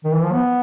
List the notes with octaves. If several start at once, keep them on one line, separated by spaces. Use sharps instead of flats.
D#3
E3
F3
B3